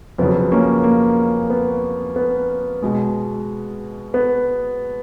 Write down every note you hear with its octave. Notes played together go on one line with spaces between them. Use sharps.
F2 C#3 F#3 B3
A#3 C#4
A#3
B3
B3
B2 G#3
B3